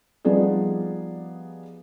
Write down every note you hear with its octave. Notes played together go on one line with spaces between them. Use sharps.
F3 G3 B3 D#4 G#4 D5